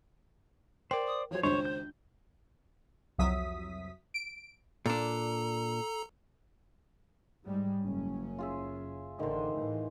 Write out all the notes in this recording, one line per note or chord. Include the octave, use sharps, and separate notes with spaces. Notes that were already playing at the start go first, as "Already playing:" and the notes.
A#4 C5 D5 G5
D#6
F3 F#3 C5 C#5
G#1 C#2 D4 C5 C#5 C6
G6
C2 F2 F#3 E5 D#6 B6
D7
A#2 D4 A4 A#5
G#2 G3 G#3
F#1 C#4
F4 G#4 E5
A1 D3 D#3 C5
A2 E3